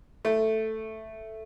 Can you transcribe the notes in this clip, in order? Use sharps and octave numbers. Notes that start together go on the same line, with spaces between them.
A3